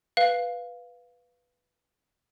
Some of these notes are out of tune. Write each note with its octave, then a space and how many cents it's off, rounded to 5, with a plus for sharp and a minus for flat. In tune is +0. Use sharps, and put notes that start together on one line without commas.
B4 +0 F5 +0